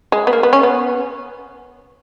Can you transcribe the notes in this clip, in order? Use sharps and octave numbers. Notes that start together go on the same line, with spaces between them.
G#3
B3
A#3
B3
C#4
B3